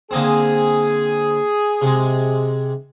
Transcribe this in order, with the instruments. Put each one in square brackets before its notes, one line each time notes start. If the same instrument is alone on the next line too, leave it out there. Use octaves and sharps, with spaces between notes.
[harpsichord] D3 A#3 C4 [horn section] G#4
[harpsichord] C3 G#3